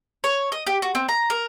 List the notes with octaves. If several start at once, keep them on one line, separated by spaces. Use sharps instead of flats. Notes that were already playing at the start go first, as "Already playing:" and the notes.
C#5
D#5
G4
F#4
C4
A#5
A#4